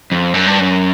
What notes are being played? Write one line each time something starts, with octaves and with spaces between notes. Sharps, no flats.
F2
F#2
G2
F#2